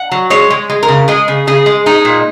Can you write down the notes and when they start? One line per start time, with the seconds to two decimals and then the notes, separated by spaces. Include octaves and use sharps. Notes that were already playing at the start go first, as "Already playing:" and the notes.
Already playing: F#5
0.12 F#3
0.30 G#3 C#5
0.50 G#3
0.70 G#3
0.83 A#4
0.88 C#3
1.08 G#3 G#4
1.28 C#3
1.47 C#3 G#4
1.66 G#3
1.86 G#3 D#4
2.05 A#2